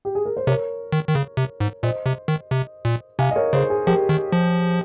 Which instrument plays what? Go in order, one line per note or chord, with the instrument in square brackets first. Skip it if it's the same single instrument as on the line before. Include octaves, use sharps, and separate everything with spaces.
[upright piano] G4
G#4
A#4
C5
[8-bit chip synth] C3 [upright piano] A#4 C#5
[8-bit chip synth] D#3
D#3
C#3
C3
G#2
[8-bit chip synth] A#2 [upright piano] C5 D#5
[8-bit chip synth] C3
D#3
C3
A#2
[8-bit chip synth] C3 [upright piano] F5 G#5
[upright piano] D#5
A#4 C#5
[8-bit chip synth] C#3 [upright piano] G#4 C5
[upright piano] G#4
[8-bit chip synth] F3 [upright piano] G4 A#4
[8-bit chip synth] D#3
F3